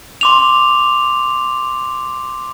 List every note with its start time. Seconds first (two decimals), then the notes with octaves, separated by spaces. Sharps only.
0.21 C6 D6 F7